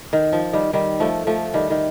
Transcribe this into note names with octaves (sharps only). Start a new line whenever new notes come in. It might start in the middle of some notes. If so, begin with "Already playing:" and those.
D#3
F3
D#3 G3
D#3 G3
F3 A3
F3 A3
D#3 G3
D#3